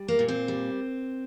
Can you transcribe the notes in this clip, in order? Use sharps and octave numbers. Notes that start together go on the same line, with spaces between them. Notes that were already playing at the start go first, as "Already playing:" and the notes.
Already playing: G3
A#3
A#2
C4
G3